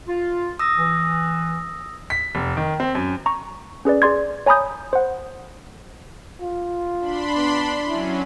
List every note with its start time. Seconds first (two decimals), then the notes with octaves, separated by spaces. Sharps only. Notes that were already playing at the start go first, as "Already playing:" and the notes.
0.08 F4
0.59 D#6 E6 A#6
0.77 E3
2.10 B6
2.35 F1
2.57 D#3
2.80 C4
2.95 F#2
3.26 A#5 C#6
3.85 C#4 G#4 B4 D5
4.02 G#4 D5 C6 G#6
4.46 C#5 G#5 A#5 B5 D#6 G6
4.93 C5 F#5
6.41 F4
7.00 D4 B5 C6
7.36 B3
7.87 F#3 C#4 E4